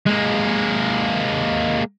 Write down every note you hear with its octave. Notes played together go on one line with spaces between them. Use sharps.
G#3 A#3